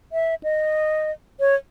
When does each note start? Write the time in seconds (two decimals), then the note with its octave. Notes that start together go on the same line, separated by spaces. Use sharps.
0.12 E5
0.43 D#5
1.40 C#5